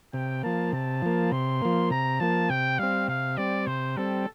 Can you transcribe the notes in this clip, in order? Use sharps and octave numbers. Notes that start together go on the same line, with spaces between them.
C3 G5
F3 A#3 A5
C3 A5
F3 A#3
C3 C6
F3 A#3
C3 A#5
F3 A#3 A5
C3 G5
G3 C4 F5
C3 F5
G3 C4 D5
C3 C5
G3 C4 A4